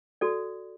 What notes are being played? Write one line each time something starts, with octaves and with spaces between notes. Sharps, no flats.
F#4 A4 D5